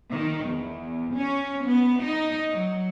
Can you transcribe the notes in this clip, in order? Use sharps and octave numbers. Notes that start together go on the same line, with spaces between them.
D#3
E2
C#4
B3
D#4
F#3